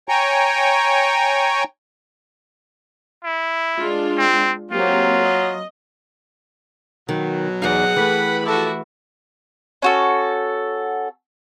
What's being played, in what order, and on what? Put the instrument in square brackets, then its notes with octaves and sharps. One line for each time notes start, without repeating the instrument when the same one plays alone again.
[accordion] C#5 G5 G#5 A#5 C#6
[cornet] E4
[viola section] G#3 D4 F4
[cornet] C4
[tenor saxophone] F#3 [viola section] A#3 C4 G4 [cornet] F4
[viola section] D#5
[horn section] B2 F#3 [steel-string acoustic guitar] D#3
[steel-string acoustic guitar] E2 D#4 [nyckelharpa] G#4 F#5
[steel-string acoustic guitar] E3 A3 [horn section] G4 B4 B5
[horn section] F3 G4 A4 [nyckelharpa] E4 F#4
[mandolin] C#4 F#4 A4